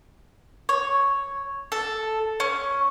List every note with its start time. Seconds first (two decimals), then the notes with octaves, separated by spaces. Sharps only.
0.69 C#5
1.72 A4
2.40 C#4